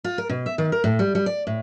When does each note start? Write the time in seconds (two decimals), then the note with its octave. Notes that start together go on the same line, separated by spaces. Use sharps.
0.04 F4
0.18 A#4
0.29 B2
0.46 E5
0.58 D#3
0.72 A#4
0.84 A2
0.99 G3
1.15 G3
1.26 D5
1.47 A2